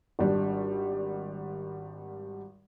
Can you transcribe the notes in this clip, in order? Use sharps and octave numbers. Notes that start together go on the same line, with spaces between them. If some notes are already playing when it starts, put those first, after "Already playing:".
G#1 G3 D4